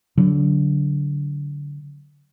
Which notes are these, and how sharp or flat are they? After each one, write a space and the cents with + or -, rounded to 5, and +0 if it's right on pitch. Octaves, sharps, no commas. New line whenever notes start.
D3 -20 F#3 +0